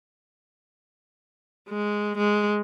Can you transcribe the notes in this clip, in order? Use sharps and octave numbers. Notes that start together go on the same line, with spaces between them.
G#3
G#3